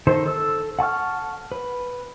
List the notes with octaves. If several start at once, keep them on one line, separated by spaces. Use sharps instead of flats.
D#3 A4 C5
A4 E6
F#5 A5 C#6 F6
B4